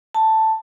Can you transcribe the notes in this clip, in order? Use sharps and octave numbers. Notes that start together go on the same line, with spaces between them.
A5